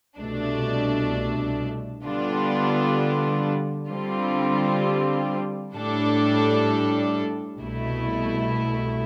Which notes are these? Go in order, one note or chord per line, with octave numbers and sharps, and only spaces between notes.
C2 B2 A3 D4
D3 G3 B3 D4 F4
D3 G3 C4 F4
A2 G3 D4 A4
C2 B2 A3 E4